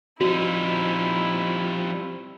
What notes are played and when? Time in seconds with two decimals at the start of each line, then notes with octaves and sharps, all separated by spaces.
0.21 F3 G3 C4 D#4 E4 F#4